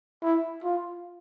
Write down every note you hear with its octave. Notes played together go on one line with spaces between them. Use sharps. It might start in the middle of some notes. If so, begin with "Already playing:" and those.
E4
F4